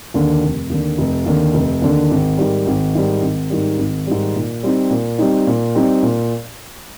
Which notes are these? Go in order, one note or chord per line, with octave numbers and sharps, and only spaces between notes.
D#2 D3
F1
D#2 D3
F1
D#2 D3
F1
D#2 D3
G#1
G#2 D#3 G3
G#1
G#2 D#3 G3
G#1
G#2 D#3 G3
G#1
G#2 D#3 G3
A#2
G3 C4 D#4
A#2
G3 C4 D#4
A#2
G3 C4 D#4
A#2